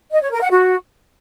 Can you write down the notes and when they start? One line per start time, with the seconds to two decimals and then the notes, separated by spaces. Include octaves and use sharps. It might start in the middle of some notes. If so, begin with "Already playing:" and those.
0.12 D#5
0.22 C#5
0.31 A#4
0.41 F#5
0.51 F#4